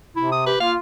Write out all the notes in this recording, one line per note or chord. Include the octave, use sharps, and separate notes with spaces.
C3 E4
D#6
G4 B4
A#3 F4 F5